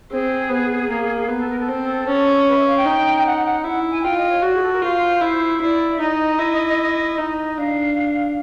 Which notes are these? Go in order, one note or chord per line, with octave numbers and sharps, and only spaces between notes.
C4 G#4
B3
A#3
B3 G#4
A4
A#4
A4
C4
C#4
B4
E5
F5
G5
D#4
F#5
F#5
E4 F#5
G#5
F4 G5
D#5
C#5
F#4 D5
G#4
A4
A#4
F4 C5
E4
E4 D5
E5
D#4 D#5
E4
D#4
D4 F5